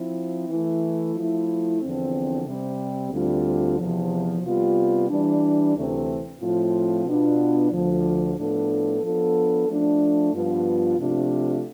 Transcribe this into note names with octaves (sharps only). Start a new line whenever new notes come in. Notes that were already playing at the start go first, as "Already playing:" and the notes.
Already playing: F3 C4 E4
E3 A3 E4
F3 A3 E4
E2 D3 F3 C4
C3 G3 C4
D2 D3 G3 C4 F4
E2 C3 F3
C3 G3 B3 F4
E3 G3 D4
D2 C3 E3 A3 C4
A2 F3 C4 F4
B2 B3 D4 F4
D2 D3 F3
A2 F3 B3 D4 A4
F3 B3 D4 A4
F3 A3 D4
G2 F3 B3 F4
C3 F3 A3 D4 F4